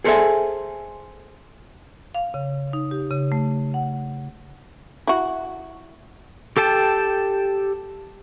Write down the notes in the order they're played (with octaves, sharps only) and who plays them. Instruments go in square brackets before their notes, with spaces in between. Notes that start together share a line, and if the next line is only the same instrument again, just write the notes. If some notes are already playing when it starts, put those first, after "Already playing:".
[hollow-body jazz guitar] G#4 A4 C5 D5 E5 G#5
[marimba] F5
C#3
D#4
G4
C#3
A3
F#5
[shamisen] E4 F#4
[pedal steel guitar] G4 A4 G5 A5